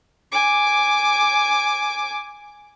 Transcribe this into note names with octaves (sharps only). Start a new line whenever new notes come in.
G#5 D6